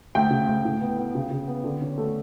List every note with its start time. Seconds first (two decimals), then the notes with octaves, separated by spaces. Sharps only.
0.15 D2 G5
0.31 C#3
0.47 D2
0.65 A2
0.81 B3
0.98 B3
1.15 C#3
1.31 C#3
1.48 B3
1.64 D3
1.82 C#4
1.98 A3